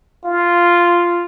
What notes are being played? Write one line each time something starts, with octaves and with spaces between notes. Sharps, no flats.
F4